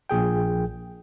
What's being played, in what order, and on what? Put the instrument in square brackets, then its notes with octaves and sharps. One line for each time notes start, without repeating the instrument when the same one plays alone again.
[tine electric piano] A#1 A#2 G#4 G5